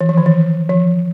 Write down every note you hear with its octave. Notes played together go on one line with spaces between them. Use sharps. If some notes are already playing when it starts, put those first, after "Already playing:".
E3
F3
D#3
E3
F3